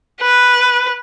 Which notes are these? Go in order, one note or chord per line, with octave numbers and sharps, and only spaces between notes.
B4